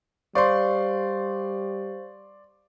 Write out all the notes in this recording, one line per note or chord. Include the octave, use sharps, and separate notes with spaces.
G3 C5 D5 F5 C6 C#6